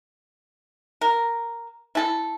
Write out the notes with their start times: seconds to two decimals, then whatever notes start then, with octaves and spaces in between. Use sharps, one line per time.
1.01 A#4
1.95 E4 A4